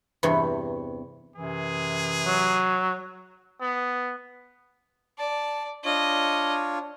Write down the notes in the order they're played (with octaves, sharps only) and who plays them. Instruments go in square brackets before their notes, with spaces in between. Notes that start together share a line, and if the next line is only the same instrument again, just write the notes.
[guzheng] E2 G2 C3 B4 C#5
[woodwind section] F#2 C3 E3 [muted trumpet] G#4
[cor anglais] F#3
[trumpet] B3
[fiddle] D5 [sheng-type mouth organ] A5
[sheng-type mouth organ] D4 F4 C#5 [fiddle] D#5